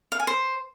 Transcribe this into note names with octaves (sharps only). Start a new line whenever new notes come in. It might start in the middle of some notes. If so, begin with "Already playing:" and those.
F5
G#5
C5